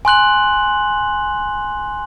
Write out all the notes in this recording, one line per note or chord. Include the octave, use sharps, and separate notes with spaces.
G#5 C6 F#6 F#7